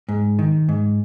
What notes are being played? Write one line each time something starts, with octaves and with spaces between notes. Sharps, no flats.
G#2
D#3
G#2